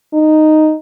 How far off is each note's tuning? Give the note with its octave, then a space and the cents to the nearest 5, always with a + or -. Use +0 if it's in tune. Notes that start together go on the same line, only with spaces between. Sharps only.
D#4 -5